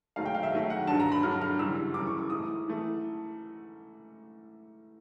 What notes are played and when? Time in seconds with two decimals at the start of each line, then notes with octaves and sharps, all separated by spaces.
0.16 G#2 D#3 F#3 A3 F5
0.26 G5
0.35 F5
0.43 E5
0.52 G#2 D#3 F#3 A3
0.70 F#5
0.87 G2 D3 F#3 A5
1.00 A#5
1.12 B5
1.23 G2 D3 F#3 F6
1.42 F6
1.59 F#2 C#3 E3 G3 E6
1.94 F#2 C#3 E3 G3 D6
2.07 C#6
2.18 D6
2.30 G#2 E3 A3 D#6
2.68 E3 A3